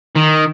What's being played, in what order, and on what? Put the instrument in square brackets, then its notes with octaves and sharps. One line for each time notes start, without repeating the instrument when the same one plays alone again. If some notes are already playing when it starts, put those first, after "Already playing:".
[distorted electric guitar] D#3